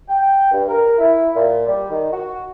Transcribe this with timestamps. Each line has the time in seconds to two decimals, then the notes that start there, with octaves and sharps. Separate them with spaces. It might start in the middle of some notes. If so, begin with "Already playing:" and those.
0.09 G5
0.51 G2
0.68 A#4
0.98 E4
1.36 A#2
1.67 G3
1.90 D#3
2.11 F#4